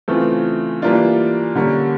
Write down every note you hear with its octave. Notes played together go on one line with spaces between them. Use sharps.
C#3 E3 A3 C4 F4
E3 G3 A#3 D4 F4
D3 G3 A#3 C#4